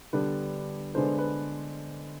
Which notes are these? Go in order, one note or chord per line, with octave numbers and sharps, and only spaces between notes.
D3 G3 B3 D4 B4
D3 G#3 B3 D4 C5
B4